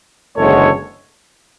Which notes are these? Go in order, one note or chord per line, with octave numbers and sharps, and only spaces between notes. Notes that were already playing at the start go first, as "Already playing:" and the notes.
F#1 E2 D3 G#3 A4 C#5